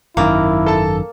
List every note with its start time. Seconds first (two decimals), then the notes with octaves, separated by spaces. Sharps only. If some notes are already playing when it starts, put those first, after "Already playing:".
0.17 G#1 F#2 D#3 A#3 E4
0.66 A4 A5